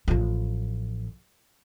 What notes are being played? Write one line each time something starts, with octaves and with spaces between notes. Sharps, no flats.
A1 F3